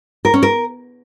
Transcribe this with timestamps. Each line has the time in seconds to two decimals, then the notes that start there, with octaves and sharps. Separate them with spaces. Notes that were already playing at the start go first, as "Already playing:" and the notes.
0.25 A#4
0.34 C#4
0.43 A#4